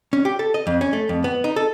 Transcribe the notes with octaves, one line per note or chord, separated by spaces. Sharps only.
C#4
G4
A4
D#5
F2
C#4
A3
F2
B3
D#4
A4